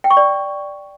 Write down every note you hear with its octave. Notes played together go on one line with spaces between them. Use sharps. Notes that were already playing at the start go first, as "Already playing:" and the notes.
G5
C#6
D5